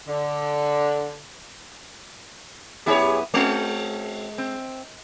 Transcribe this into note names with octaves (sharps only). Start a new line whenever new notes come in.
D3
F#2 B3 E4 G4 G#4 C#5
G#3 C4 C#4 F#4
C4